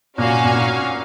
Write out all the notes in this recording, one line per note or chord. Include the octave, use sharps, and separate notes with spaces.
A#2 C#4 F#4 C#5 F5 G#5
A#2